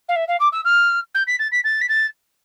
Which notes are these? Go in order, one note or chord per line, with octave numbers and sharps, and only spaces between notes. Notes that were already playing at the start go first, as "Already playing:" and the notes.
F5
E5
F5
D6
E6
F6
G6
B6
A6
B6
A6
B6
A6